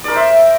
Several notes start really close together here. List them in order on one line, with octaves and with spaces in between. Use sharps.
D5 A#4 C5 E5